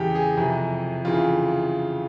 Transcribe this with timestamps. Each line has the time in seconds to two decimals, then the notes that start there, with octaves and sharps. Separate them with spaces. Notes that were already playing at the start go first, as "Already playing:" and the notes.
Already playing: E2 C#3 E3 G4
0.15 G#4
0.37 F2 C3 E3
1.05 F2 C#3 E3 F4